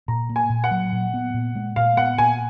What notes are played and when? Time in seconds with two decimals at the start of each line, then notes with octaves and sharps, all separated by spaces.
0.08 A#2 A#5
0.29 A#3
0.36 G#5
0.50 A#2
0.64 F#5
0.71 F#3
0.92 A#2
1.14 B3
1.34 A#2
1.55 G#3
1.76 A#2 F5
1.97 B3 F#5
2.18 A#2 G#5